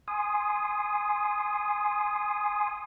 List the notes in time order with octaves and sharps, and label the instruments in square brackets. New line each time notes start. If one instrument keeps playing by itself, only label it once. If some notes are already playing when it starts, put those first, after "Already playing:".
[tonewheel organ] G#5 C6 D#6